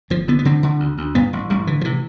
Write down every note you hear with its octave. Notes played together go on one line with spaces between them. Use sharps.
G1 F3
D3 B3
B3
D3 C4
D3
D2
D2
G2 B3
A1
A1 G3
D3 E3
F3
C3 E3